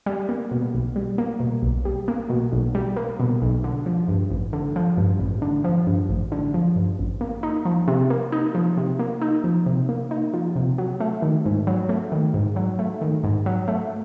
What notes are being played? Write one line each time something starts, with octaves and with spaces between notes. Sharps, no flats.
G3
A#3
B2
B1
G3
A#3
B2
B1
G3
A#3
B2
B1
G3
A#3
B2
B1
D3
F3
G2
A1
D3
F3
G2
A1
D3
F3
G2
A1
D3
F3
G2
A1
A#3
D#4
F3
C3
A#3
D#4
F3
C3
A#3
D#4
F3
C3
A#3
D#4
F3
C3
F#3
A3
D#3
G#2
F#3
A3
D#3
G#2
F#3
A3
D#3
G#2
F#3
A3